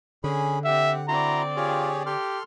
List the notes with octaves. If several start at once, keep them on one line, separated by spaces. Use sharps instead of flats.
D3 C#4 G#4 B5
C4 G4 E5 F#5
C4 E4 F#4 D5 A#5 C6
F4 G4 G#4 C#5
G4 A4 C6 F6